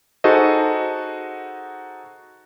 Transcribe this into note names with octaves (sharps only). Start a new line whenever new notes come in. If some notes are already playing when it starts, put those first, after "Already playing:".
D#4 F#4 G#4 A4 C5 D#5